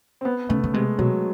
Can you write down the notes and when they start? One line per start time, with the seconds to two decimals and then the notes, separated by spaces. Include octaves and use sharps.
0.21 C4
0.25 B3
0.49 C#3 A3
0.64 C#3
0.74 C3 G#3
0.99 B2 F#3